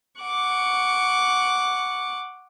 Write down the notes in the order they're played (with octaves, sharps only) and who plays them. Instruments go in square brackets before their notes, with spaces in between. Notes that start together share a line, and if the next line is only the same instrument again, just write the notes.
[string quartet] F#5 C#6 D6